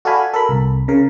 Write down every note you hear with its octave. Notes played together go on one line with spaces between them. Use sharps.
F#4 A4 D5 F5 G#5 B5
A4 A#4 B5
C2
C#3 A#4